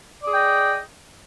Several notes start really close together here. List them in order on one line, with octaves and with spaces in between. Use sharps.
D5 G#4 G5 D#5